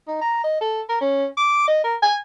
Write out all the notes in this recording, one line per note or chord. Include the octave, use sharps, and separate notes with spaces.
D#4
A#5
D#5
A4
A#4
C#4
D6
D#5
A#4
G#5